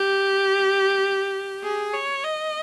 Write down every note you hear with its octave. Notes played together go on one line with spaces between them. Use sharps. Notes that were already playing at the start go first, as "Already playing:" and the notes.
Already playing: G4
G#4
C#5
D#5